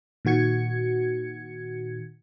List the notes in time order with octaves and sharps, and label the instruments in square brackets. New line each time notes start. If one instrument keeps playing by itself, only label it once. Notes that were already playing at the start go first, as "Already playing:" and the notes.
[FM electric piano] A#2 D#3 F#4 G#6 C#7